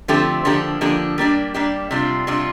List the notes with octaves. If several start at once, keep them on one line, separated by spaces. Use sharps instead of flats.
D3 F3 A3 C4 G4
D3 F3 A#3 D4 G4
D3 F3 A#3 D4 G4
G3 A#3 D4 G4 D5
G3 A#3 D4 G4 D5
C3 G3 D4 F4
C3 G3 D4 F4